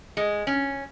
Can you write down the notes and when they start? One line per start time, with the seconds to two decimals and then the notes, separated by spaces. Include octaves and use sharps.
0.17 G#3
0.47 C#4